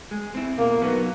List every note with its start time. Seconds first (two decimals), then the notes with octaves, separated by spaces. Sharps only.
0.11 G#3
0.35 C4 E4
0.58 B2 A#3
0.82 F#3 B3 D#4